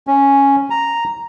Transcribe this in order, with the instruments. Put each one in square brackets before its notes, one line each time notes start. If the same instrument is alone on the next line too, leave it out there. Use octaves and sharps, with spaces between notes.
[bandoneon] C#4
A#5